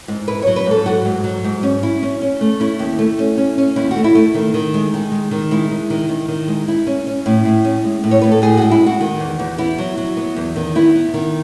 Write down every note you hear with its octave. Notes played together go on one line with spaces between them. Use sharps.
G#2
E4 B4
F#3 C#5
B4
G#2 A4
F#3 F#4
G#2
F#3
G#2
C#4
E4
C#4
C#4
A3
C#4 E4
D#2
A3
C#4
C#4
C#4
D#2 E4
F#4
A3
E4
A3
D#3
D#3
G#3
D#3
G#3
D#3
G#3 E4
G#3
D#3
D#3
D#3
G#3
E4
C#4
C#4
A2 E4
A2
C#4
G#3
A2
C#5
A2 B4
A4
A2 G#4
G#3 F#4
E4
G#3
F#4
D#3
E2
E2
B3 E4
F#3
F#3
B3
E2
D#3
B3 E4
B3
D#3